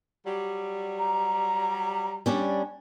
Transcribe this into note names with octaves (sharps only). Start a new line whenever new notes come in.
F#3 G3
A#5
G3 C#4 D4